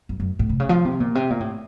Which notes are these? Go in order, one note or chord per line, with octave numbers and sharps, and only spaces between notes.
F#2
F#2
A2
C3
C#3
F3
C3
A#2
C3
A#2
A2